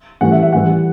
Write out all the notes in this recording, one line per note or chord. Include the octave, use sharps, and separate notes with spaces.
A2 E3 G3 F#5
E5
E5
A2 E3 G3 F#5